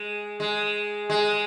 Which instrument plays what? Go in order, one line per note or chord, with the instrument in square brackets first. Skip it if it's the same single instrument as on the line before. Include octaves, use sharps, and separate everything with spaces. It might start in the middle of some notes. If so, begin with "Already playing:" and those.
Already playing: [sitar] G#3
G#3
G#3